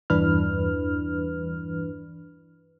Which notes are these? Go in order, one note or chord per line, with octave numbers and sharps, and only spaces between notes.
E2 G2 E3 D4 B4 F6